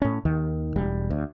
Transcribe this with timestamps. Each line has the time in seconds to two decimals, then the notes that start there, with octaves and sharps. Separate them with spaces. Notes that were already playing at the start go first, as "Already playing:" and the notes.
0.02 A2 C#4
0.25 D#2 D#3
0.76 E1 G3
1.10 D2